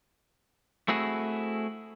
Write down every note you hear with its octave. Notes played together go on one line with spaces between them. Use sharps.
A3 C4 E4 F#4 G#4